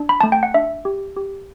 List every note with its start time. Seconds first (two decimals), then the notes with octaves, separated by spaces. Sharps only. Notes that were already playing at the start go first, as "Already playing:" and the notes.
Already playing: D4
0.09 B5
0.21 A3 A5
0.32 G5
0.43 F#5
0.54 D4 E5
0.85 G4
1.17 G4